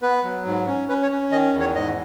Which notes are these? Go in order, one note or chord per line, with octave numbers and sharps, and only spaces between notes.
B3 B4
F#3
G#2
C#4
C#4 B4
C#5
C#4
D#3 D#5
E2
C#5
G#2 D#5